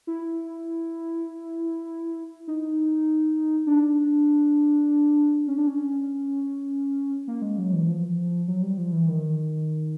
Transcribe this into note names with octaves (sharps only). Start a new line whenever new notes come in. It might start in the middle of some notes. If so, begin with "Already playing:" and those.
E4
D#4
D4
C#4
D4
C#4
A#3
G#3
F#3
E3
F3
F#3
G3
F3
E3
D#3